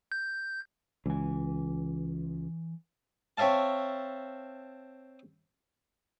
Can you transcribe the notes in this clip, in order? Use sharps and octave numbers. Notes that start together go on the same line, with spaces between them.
G6
C#2 E3 G#5
C4 C#5 E5 F5 A5